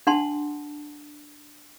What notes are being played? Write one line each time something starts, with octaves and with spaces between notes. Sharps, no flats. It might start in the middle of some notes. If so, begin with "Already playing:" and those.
D4 F#5 A5 C6